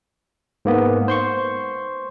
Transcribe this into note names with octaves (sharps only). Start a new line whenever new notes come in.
G#2 A#3 B3
C5 C6 C#6